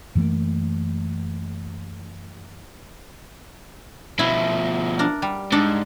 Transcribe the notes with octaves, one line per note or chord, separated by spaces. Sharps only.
F#2 E3 A3 A#3
B2 F3 E4
D4 A#4
G3
G#2 D4